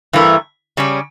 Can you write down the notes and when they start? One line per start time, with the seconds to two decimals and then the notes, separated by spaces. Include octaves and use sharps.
0.13 G2 E3 A3 E4 A#4
0.77 C#3 G3 C#4